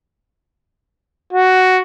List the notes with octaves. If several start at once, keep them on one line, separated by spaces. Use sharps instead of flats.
F#4